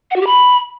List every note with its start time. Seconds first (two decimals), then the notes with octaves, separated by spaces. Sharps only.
0.11 F#5
0.16 F#4
0.21 G4
0.27 B5